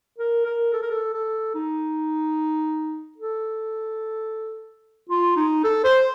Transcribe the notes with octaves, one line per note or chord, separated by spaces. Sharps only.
A#4
A#4
A4
A#4
A4
A4
D#4
A4
F4
D#4
A4
C5